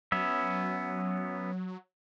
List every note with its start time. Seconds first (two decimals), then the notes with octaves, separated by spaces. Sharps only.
0.12 F#3 B3 C#4 E5